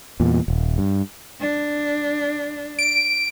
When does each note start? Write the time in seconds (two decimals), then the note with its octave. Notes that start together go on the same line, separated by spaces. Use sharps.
0.20 E2 A#2
0.48 D#1
0.78 G2
1.40 D4
2.79 D7